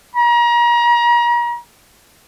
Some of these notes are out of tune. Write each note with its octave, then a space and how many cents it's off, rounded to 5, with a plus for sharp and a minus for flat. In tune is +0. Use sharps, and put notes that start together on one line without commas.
A#5 +35